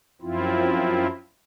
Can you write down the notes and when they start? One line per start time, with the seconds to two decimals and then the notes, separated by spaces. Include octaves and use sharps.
0.22 F#2 F3 C4 E4 F4